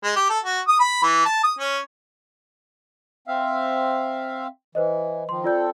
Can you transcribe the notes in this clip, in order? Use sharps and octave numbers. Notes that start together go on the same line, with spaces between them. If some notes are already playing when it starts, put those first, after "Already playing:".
G#3
G4
A4
F#4
D#6
B5
E3
A5
D#6
C#4
C4 E5 F5
E3 B4 C5 D#5
D#3 F3 C6
C4 F4 A4 D5 G6